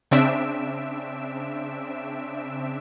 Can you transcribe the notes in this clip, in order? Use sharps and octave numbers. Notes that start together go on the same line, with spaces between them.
C#3 C4 D4 E5 D7 E7